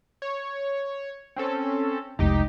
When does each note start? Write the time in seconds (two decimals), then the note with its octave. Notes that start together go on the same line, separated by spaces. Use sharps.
0.22 C#5
1.36 C4 C#4 A4
2.19 F1 C2 G#3 D#4 G4